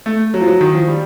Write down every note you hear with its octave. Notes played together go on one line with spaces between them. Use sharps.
A3
F#3
F3
F#3
D#3
F3
G3